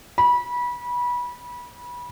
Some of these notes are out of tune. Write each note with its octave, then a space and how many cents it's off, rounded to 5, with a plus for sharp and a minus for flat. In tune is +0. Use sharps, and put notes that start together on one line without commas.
B5 -25